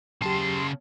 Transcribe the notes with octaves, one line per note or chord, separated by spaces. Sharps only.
D#2 C#3 F#3 G4 A5 C6